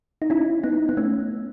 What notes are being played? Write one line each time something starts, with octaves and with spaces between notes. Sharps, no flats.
D#4
C#4 E4
B3 D#4
B3
A3 C#4